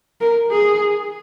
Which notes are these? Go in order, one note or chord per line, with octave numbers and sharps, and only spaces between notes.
A#4
G#4